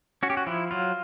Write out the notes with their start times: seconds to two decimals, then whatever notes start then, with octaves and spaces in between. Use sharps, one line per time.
0.23 C#4 F#4
0.30 G4
0.37 F#4
0.47 F3 E4
0.71 F#3 F4